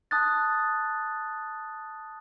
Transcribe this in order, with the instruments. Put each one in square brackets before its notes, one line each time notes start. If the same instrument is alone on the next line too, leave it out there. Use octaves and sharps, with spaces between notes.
[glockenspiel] A5 D#6 F#6 A6